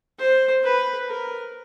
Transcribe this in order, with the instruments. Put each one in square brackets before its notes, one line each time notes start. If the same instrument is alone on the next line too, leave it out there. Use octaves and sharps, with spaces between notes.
[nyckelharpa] C5
B4
A#4